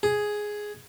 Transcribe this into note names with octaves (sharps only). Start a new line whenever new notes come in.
G#4